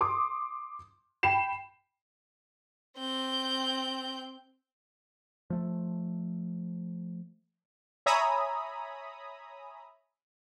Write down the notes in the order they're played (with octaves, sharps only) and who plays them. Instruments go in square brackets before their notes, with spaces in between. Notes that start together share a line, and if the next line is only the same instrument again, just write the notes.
[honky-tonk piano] C6 D6 D#6
G5 B5 C7 E7
[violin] C4 G6
[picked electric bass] F3 A3
[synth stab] C#5 E5 G#5 A#5 B5 D#6